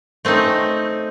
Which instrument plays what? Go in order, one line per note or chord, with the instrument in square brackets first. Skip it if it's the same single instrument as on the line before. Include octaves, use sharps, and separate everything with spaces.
[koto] A3 C4 C#4 D#4